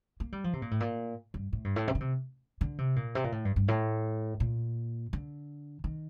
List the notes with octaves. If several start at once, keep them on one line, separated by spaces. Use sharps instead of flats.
A#3
G3
F3
C3
A#2
A2
A#2
G2
A2
G2
A2
C3
D3
C3
D3
C3
A#2
C3
A#2
A2
G2
G2
A2
A#2
D3
D#3